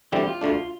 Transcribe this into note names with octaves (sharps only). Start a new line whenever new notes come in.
E2 D3 G3 C4 E4 G4
F4
D2 D3 A3 D4